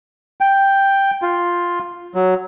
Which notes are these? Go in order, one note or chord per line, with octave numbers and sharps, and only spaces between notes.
G5
F4
F#3